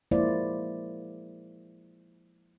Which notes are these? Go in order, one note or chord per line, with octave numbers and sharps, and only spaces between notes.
F3 G#3 A#3 E4 C5 D5